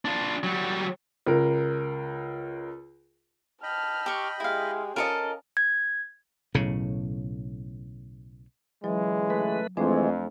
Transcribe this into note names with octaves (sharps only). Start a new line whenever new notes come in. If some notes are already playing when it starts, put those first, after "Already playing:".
D4 F4
F#3 G3
C#2 A#4
D#5 G5 A5 B5 F6
G4 C#6
G#3 E4 G4 F5
C#4 F4 A4 A#4 D#5
G#6
B1 A2 C#3
C#2 E3 F#3 G#3
A3 B4
F2 E3 G#3 A3 C4 D4